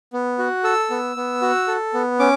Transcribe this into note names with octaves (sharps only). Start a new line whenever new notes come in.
B3
F#4
A4 E6
B3
B3
F#4
A4
B3
C#4 D6